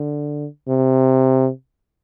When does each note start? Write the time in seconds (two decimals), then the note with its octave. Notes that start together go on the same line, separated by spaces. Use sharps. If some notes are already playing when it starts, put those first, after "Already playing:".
Already playing: D3
0.68 C3